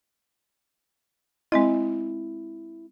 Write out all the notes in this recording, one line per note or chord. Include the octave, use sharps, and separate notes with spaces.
G#3 C4 E4 D#5